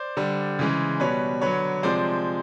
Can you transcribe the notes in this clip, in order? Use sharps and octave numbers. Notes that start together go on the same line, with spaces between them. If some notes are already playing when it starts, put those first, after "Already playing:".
Already playing: C5 D5
D3 G3
C#3 E3 G#3
B2 G3 B4 C#5
D3 F#3 B4 C#5
C3 F3 G#3 C5 D5